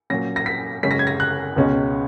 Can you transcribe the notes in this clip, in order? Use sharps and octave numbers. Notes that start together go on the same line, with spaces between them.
A#2 F#3 A#3 C#4 A#6
A#6
B6
F#2 C#3 G#3 C#4 B6
A#6
G#6
A#6
F#6
C#2 B2 G#3 C#4